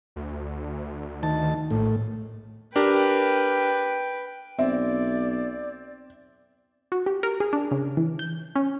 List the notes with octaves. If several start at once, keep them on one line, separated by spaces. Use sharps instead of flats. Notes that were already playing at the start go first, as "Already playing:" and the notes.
D2
D#3 A5
A#1 A2
D4 G4 A#4 B4 G5
B1 C4 D5 E5
F#4
G4
A#4
G#4
D4
C#3
E3
G6
C#4